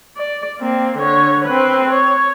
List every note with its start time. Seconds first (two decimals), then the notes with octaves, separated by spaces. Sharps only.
0.17 D5
0.59 A#3 C4
0.98 D3 C#5
1.45 C4 B4
1.91 C#5